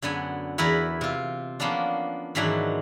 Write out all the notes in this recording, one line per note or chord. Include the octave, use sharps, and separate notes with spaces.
F#2 D3 B3 G#5
E2 E4 A#4 B4 A#5
C3 F4
F3 A#3 B3 C#4 D4
G#2 D#3 E3 F#3 D4 F#4